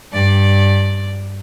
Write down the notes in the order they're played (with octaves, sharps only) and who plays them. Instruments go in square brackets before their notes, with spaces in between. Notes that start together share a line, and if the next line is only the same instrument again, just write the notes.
[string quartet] G2 D5